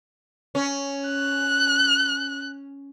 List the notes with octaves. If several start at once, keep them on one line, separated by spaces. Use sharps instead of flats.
C#4
F#6